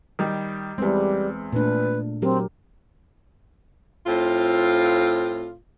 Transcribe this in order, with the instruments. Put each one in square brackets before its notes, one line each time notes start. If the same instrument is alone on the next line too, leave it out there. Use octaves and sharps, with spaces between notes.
[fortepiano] D#3 G3
[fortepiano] E2 C4 [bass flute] G3 [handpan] G#3 B4
[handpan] A#2 A3 D4 [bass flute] B4
[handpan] F#3 G4 A#4 [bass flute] C4
[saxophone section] A2 C4 F4